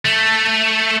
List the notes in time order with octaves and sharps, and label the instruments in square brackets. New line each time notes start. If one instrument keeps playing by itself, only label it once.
[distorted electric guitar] A3